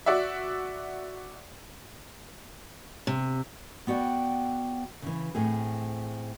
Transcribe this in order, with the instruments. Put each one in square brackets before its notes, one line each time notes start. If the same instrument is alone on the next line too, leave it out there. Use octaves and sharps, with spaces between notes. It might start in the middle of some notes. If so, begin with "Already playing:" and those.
[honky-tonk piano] F#4 D5 E5
[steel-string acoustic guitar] C3
B3 F#4 D5 G5
C#3 E3
A2 A3 C4 G#4